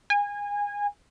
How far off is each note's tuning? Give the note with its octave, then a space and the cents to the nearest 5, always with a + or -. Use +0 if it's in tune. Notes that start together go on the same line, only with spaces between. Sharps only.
G#5 -25